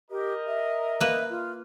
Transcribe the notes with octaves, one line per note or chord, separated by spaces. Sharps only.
G4 A#4 D#5
E5
A#3 B4
F4